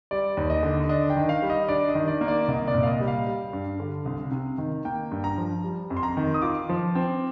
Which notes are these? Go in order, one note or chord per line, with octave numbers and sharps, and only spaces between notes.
G3 D5
D#2
D#5
D3
D4 D#5
G5
D#3
F5
G3
D#5
D4 D5
D#5
D#3
D5
A#3
D5
C2 D#5
D5
A#2
F5
D#5
G3
F5
G3
G2
D3
C2
C3
D#3
A#3 G5
G2
A#5
F3
G3
F2
C6
A#5
D#3
D#6
F4 D6
F3
C4